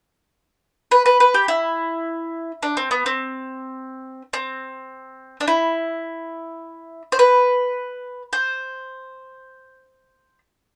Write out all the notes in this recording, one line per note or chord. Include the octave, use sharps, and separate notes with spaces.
B4
B4
B4
G4
E4
D4
C4
B3
C4
C4
D4
E4
C5
B4
C5